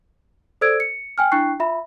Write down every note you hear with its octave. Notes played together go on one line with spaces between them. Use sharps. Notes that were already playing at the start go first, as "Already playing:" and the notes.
A4 C5 D5 E6 G#6 D7
C#7
G5 G#5 F6
D4 E4 G5 C#6 F#6 C7
F4 E5 B5